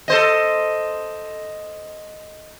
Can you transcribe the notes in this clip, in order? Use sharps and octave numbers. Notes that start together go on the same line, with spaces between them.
A4 C5 D#5